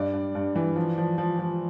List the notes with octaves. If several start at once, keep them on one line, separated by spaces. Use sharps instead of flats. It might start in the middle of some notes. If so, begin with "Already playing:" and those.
Already playing: G2 D5
G2
G2
E3
F3
F3
F3
F3